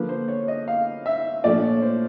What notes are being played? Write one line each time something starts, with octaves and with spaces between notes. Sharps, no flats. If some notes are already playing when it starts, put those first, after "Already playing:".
Already playing: D3 F3 A#3 B4
C5
C#5
D#5
F5
E5
A#2 F3 A3 D4 D5
C#5
C5